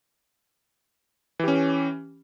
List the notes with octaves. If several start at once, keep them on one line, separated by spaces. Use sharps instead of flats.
E3 C#4 G4